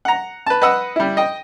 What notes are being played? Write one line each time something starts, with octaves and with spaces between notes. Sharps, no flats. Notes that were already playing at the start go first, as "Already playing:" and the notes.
F#5 A#5
B4 A5
B4 D#5 F#5 E6
G3 E4
D#5 G5